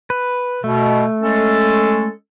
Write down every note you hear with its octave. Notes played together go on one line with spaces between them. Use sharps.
B4
B2 A3
G#3 C#4 A4